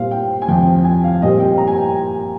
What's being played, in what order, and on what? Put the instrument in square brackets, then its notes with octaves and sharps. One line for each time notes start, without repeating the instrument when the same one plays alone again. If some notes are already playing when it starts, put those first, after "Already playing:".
Already playing: [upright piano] A#2 G3 C4 F5
G5
G#5
F2 C3 F3 C4 G5
G#5
F5
A#2 G3 C4 D#5
G5
A#5
G#5
G5